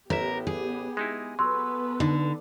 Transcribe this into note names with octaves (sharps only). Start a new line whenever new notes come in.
A1 B3 G4 A#4 E5
G#4
G#3 D#4 E4
F#3 B3 A4 B4 C6 E6
D3 D#4